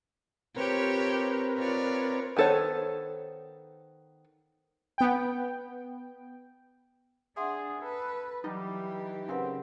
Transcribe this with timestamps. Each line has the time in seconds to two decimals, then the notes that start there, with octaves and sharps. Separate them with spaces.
0.57 C4 F4 G4 A#4 B4 C#5
1.57 F4 C#5 D5
2.37 D#3 B3 A4 C5 C#5
4.98 B3 G5
7.37 D4 G#4 E5 F#5 C6
7.82 A4 B4
8.44 E3 F#3 G3 D#4 G4
9.28 C#3 C4 A#4 B4 F#5